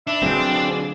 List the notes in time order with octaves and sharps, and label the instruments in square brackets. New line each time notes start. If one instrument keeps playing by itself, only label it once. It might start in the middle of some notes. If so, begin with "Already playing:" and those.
[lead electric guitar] D4 [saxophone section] B4 E5
[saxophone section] B2 F4 G#4 [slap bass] D3 F#3 A3 [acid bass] C4